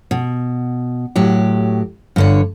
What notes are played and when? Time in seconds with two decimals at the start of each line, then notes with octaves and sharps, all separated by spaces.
0.11 B2
1.16 A2 F#3 G4
2.16 G2 D3 C#5